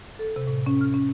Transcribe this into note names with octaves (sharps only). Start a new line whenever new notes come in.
A4
C3
A2
C#4
F6
C#4